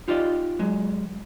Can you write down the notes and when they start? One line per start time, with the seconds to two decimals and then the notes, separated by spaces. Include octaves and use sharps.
0.08 D#4 F4 G4 D5 D#5
0.59 F#3 G#3